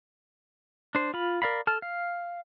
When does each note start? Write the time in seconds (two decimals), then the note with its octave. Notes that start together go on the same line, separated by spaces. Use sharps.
0.95 D4 C5
1.14 F4 B5
1.42 A#4 D5 F5 B5
1.67 A4 A5 F6
1.82 F5